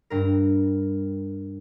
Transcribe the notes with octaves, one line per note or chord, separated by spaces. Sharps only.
G2 A#4